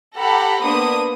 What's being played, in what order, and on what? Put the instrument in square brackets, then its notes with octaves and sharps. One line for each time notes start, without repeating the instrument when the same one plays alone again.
[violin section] G4 A4 F#5 A#5 B5
A#3 B3 D4 C5 D#6